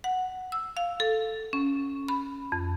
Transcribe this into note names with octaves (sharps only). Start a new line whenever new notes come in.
F#5
E6
F5
A4
C#4
B5
F2